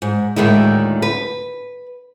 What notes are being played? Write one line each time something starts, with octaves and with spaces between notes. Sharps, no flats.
G#2
D2 A2 D#3 G#3 E4
B4